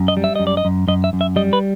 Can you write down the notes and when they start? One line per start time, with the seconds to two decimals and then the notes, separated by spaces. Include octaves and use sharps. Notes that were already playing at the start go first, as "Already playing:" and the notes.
Already playing: F#2
0.08 D#5
0.17 G3
0.24 E5
0.35 F#2 D#5
0.47 D5
0.57 D#5
0.65 F#2
0.88 F#2 D#5
1.04 E5
1.13 F#2
1.21 E5
1.36 G3 D#5
1.53 B4